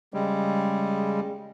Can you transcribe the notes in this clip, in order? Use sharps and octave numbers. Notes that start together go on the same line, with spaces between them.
C#3 G3 G#3